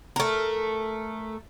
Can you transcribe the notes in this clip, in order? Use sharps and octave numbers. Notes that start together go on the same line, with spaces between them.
A3 A#4